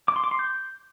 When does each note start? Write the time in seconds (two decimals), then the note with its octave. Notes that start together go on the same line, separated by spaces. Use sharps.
0.08 D6
0.16 C6
0.24 D6
0.31 C6
0.39 G6